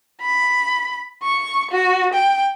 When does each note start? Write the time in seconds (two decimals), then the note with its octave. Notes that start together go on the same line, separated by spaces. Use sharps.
0.21 B5
1.23 C#6
1.71 F#4
2.14 G5